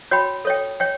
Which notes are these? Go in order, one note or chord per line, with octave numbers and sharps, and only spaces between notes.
F#4 C#5 G5 B5
A4 C#5 G5
C#5 G5